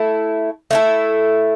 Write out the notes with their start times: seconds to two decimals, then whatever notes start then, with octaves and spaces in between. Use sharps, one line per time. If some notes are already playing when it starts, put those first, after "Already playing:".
Already playing: A3 E4 A4
0.71 A3 E4 A4